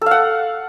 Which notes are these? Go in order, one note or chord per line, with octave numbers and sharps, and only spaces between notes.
A4 F5 F#5